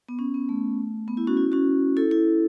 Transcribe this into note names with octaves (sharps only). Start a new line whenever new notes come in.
B3
C#4
B3
A3
B3
E4
C#4 F#4
E4
C#4 F#4
E4 A4
E4